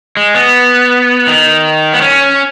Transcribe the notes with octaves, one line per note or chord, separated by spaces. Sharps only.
G#3
B3
D#3
B3
C#4